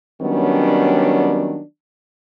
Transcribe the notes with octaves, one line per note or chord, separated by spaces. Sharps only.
D#3 F#3 G3 B3 C#4 D4